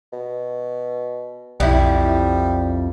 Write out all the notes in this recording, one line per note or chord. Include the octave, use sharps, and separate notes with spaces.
B2
B1 F2 G3 E4